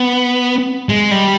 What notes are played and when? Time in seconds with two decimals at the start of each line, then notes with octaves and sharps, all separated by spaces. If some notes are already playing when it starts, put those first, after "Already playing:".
Already playing: B3
0.89 G#3
1.11 G3